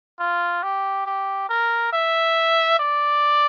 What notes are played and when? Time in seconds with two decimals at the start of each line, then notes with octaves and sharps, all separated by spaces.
0.20 F4
0.63 G4
1.06 G4
1.49 A#4
1.93 E5
2.80 D5